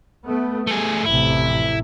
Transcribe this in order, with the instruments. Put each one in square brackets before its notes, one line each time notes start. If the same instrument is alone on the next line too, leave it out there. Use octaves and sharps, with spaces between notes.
[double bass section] A3 B3
[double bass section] G3 [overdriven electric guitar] A3 G#4
[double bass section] A1 F2 C3 [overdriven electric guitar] E4